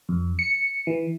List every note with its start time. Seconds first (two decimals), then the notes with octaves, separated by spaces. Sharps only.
0.09 F2
0.39 C#7
0.87 E3